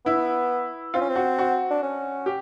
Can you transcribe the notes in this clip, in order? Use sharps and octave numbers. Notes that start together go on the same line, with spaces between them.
B3 E4
C4 F4
C#4
C4
F#4
F#4
D4
C#4
G4